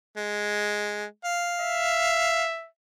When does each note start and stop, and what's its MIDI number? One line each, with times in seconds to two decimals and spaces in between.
0.17 1.04 56
1.25 2.44 77
1.61 2.68 76